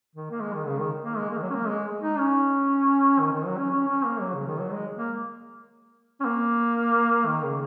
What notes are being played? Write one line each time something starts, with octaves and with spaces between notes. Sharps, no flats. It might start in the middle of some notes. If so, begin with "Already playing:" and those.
D#3
A#3
G#3
D#3
C#3
D#3
A#3
G#3
A#3
D#3
F#3
C#4
A#3
G#3
D#4
C#4
D#3
D#3
F#3
C#4
C#4
C#4
A#3
F#3
C#3
D#3
F#3
G#3
A#3
C#4
A#3
D#3
C#3